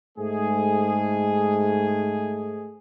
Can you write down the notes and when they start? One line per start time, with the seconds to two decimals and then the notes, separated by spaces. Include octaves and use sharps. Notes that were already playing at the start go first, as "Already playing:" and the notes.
0.17 G#2 A3 G#4